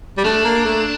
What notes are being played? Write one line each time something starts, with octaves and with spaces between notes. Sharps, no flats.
G3
A3 D4
A#3
A3